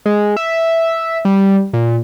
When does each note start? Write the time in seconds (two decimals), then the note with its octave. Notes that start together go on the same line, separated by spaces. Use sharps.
0.06 G#3
0.37 E5
1.25 G3
1.73 A#2